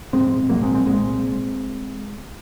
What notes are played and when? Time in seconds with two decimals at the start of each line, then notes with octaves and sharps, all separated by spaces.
0.13 A#1 G#2 G#3 C4
0.49 C2 A#2 F#3 A#3
0.62 G#3 C4
0.74 G#3 C4
0.86 C2 A#2 G#3 C4